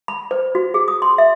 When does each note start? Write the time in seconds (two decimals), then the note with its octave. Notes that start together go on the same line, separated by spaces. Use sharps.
0.08 B5
0.31 C5
0.55 F#4
0.74 G#4
0.88 D#6
1.02 C6
1.18 E5